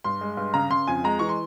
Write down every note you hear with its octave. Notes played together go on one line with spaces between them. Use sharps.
G2 C6
G#3
G2
C#3 A#5
C#3 C6
F2 G#5
G#3 A#5
E3 C#6
C6